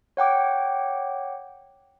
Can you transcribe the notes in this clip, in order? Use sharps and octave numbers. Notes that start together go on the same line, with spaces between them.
C#5 F#5 G5 D6